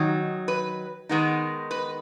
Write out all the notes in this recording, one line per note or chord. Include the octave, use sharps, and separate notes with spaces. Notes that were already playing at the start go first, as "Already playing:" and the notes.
Already playing: D#3 F#3 D#4
B4
D#3 G#3 B3 D#4
B4